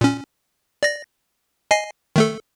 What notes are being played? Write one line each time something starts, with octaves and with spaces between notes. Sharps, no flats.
A#2 C#4
D5 A#6
D#5 G#5 C7
D#3 A3 A4